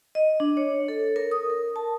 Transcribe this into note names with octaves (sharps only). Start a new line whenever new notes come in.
D#5
D4
C#5
A4
A#4
D#6
A#4
A5